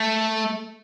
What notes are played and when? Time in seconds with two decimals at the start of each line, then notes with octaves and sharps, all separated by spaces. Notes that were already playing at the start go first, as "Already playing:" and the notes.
Already playing: A3